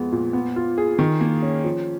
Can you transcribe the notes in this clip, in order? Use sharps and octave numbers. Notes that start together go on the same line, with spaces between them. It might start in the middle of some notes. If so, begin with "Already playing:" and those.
Already playing: F2 G#3 B3
A#2
B3
F4
G#4
D#3
A#3
C#4
F3